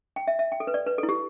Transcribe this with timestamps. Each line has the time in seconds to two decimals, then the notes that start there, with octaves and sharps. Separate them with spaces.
0.16 G5
0.27 E5
0.39 E5
0.52 G5
0.60 A4
0.67 B4
0.74 D5
0.86 B4
0.98 A4
1.03 E4
1.09 G4